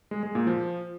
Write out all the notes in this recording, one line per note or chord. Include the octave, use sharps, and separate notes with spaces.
G#3
G#3
A#2
F3